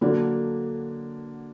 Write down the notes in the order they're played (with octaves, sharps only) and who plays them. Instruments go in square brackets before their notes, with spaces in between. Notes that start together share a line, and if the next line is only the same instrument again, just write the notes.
[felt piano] D3 F#3 A#3 D4